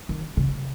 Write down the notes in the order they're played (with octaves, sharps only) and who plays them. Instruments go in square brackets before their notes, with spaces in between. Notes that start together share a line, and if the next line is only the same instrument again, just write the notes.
[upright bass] D#3
C#3